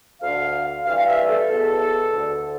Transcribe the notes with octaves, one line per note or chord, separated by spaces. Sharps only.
D2 D3 F5
G2 E3 F5
F5
E5
A4
E2 B2
D2 D3